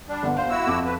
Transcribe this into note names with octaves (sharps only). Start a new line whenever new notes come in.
G3 D4
G1 B3 F#5
D#2 C5 F5
E4 F#4 E6
F2 D6
B4